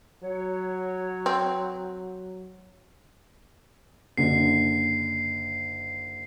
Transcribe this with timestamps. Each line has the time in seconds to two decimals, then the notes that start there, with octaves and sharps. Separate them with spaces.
0.23 F#3 C#5
1.26 C4
4.17 F#1 D3 C7